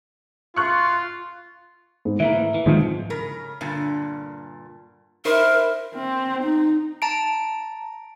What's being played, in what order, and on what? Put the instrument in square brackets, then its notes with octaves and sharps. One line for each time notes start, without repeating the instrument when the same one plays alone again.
[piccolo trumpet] F4 [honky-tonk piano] C#6 F#6
[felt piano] G#2
[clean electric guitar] E3 A3 A#3 [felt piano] E4 E5
[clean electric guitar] E3
[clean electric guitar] D#2 C3 [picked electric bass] G#2 D#3 F3
[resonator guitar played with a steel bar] C#3 A#4
G2 A#2 D3
[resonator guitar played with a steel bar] D#4 E4 C5 [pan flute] A#4
[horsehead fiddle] C4
D#4
[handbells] A5 A#5 D7